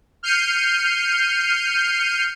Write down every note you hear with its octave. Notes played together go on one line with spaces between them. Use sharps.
F6 G6 C7 C#7 D#7